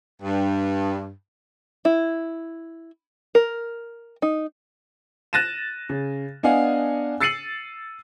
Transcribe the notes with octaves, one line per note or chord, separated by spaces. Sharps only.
G2
E4
A#4
D#4
F#6 A6 A#6 D#7 E7
C#3
B3 D4 D#5 F5 F#5 G#5
E6 A6 C7 C#7 D#7 F#7